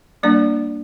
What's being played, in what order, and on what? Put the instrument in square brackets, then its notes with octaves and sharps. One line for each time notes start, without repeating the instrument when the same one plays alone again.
[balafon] G3 A#3 D4 D5